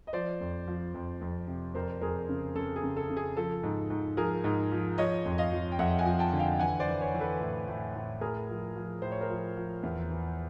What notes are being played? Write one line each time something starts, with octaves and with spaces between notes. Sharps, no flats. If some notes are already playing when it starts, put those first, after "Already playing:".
D#5
F3 C5 D5
F2
F3
F2
F2
C3
F2 A#4 C5
F2 G#4 A#4
C#3
C#3 A4
G#4
C#3
A4
C#3
G#4
F3 A4
G#2
G#2
F3 G#4 A#4
G#2
F3
F3 C#5 D#5
F2
D#5 F5
F3
G5
F2 E5 F#5
F#5 G#5
F3
G5 A5
D3
F5 G5
E3 F#5 G#5
C5 D5
E3
B4 C#5
E3
A4 B4
A2
A2
A2
A2 G#4 A#4
F3
F3
A2 C5
C#5
A#4 C5
F3
F3
E2
E3